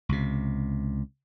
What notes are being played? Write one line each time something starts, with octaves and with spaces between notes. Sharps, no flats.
C#2 C3